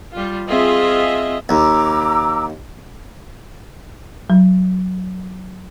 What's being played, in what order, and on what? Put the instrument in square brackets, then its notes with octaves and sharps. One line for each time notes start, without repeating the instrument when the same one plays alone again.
[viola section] G3 F4
C4 F4 G#4 D#5 E5
[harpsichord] D#2 [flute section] A#5 D6 E6
[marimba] F#3